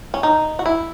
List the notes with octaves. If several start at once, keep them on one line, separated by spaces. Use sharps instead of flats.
C#4
D#4
F#4
E4